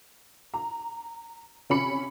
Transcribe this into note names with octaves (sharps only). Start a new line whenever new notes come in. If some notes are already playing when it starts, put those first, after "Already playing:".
A#5
C3 C#4 B5 C#7